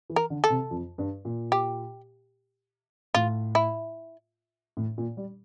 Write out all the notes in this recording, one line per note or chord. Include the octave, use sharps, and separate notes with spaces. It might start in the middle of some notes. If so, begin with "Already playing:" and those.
E3
A#4
D3
A4
C3
F2
G2
A#2
G4
A2 F4
E4
A2
A#2
G3